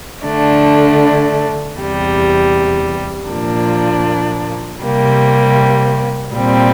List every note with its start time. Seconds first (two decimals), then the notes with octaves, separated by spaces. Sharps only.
0.25 D3 A3 D4
1.78 E2 C3 G3
3.29 A#2 F3 A#3 D4
4.81 C3 G3 A#3
6.34 A#2 G3 C4